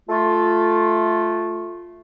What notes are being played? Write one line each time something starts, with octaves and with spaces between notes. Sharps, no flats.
A3 F4